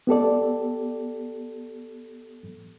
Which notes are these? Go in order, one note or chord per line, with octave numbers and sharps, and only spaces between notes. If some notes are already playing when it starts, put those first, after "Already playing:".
B3 G4 A4 D5